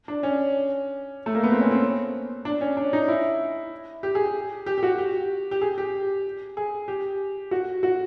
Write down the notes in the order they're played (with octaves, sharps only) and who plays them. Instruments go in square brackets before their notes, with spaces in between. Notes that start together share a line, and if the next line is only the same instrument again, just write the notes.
[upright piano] D4
C#4
A3
A#3
B3
C4
C#4
C4
D4
C#4
D4
D#4
E4
G4
G#4
G4
G4
G4
F#4
G4
G4
G#4
G4
G#4
G4
F#4
F#4